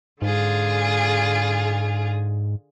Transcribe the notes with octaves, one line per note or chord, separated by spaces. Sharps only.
G#2 D3 F4 G#4